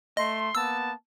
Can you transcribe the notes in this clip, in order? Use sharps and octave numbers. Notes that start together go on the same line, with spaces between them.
A3 D#5 C6
A#3 B3 A5 E6